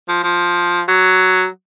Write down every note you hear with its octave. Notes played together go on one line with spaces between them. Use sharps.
F3
F3
F#3